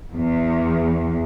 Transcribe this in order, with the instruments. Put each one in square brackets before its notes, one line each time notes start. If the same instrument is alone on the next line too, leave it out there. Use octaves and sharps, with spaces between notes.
[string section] E2